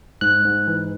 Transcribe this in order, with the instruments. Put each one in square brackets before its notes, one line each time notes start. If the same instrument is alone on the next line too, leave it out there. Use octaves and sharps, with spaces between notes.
[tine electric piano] G#2 F#6
G#2
E3